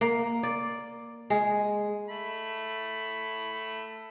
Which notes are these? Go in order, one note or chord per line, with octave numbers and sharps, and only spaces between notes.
A#3
D5
G#3
A3 B5